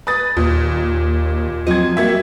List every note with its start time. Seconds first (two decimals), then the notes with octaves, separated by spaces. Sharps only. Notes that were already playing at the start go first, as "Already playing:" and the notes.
0.07 B4 D#6 A6
0.37 D#2 A#2
1.67 F3 F#3 C4 D#5 G#6
1.97 G3 A#3 F#4 E5 G#6